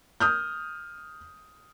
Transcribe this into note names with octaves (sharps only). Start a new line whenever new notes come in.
D#6 F6 G6